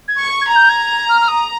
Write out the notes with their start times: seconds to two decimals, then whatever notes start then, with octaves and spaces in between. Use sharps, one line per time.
0.08 G#6
0.19 C#6
0.41 G#6
0.49 A#5
0.56 G6
0.69 G#6
1.09 F6
1.21 F6
1.28 D#6